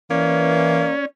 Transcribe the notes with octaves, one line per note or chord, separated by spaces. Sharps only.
E3 A#3 C#4 D5